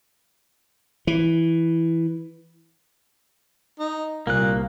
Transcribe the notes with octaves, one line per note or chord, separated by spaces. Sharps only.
E3
D#4
C2 A#2 A#3 F#6